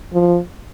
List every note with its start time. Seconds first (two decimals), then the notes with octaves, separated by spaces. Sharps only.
0.13 F3